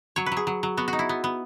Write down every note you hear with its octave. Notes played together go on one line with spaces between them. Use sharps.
F#3 C#5
B4
F#3
G#4
F#3
F#3
B3 F#4
F#4
D#4
E4
B3
B3